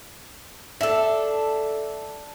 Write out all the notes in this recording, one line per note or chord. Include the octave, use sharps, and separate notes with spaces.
D4 A4 E5